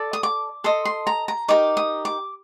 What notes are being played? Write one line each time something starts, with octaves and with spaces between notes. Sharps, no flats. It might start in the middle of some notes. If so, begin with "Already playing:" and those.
Already playing: A4 D5
D#6
D6
A4 D#5 C6
C6
A#5
A#5
D#4 G4 A#4 D6
D#6
D6